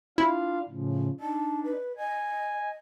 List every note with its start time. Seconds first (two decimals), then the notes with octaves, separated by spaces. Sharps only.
0.18 D4 E4 F4 F5
0.69 A2 C#3 F3
1.20 D4 D#4 A5
1.64 B4
1.97 D#5 G#5